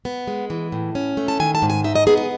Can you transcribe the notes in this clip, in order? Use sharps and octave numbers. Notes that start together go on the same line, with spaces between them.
B3
G#3
E3
A2
C#4
A3
A5
D#3 G#5
A5
G#2
G#5
D#4 E5
D#5
B3 G#4
G#4